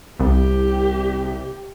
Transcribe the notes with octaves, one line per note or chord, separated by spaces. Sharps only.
C2 G4